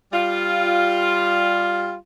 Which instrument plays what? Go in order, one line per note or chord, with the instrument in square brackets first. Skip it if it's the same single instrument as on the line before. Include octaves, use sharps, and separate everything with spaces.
[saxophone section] G3 F4